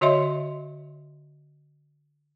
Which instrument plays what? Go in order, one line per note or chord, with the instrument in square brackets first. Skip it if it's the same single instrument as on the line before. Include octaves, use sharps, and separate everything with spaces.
[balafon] D3 F#4 C#5 D#5 E5 C6